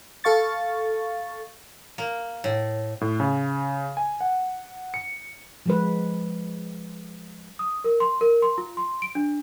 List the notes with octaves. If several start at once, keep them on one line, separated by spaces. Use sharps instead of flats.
A4 F5 C#6 A6
A#3
A2
A2
C#3
G#5
F#5
C#7
F3 G#3 B4
D#6
A#4
C6
A#4
C6
F4
C6
D7
D4